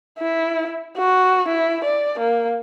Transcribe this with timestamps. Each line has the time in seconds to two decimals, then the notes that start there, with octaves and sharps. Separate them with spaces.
0.18 E4
0.97 F#4
1.48 E4
1.84 D5
2.19 A#3